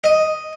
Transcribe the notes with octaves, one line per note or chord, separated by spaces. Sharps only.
D#5